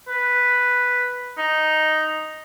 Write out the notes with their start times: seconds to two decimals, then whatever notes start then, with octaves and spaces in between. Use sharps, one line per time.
0.08 B4
1.38 D#4